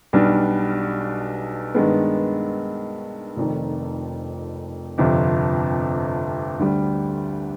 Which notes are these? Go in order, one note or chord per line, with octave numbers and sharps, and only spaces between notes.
B1 B2 G3 D4
G2 D#3 G#3 B3
F1 F2 D#3
G1 F2 C3 F3
D2 D3 G3